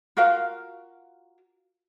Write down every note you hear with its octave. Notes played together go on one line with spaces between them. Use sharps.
F4 F#4 A#4 F5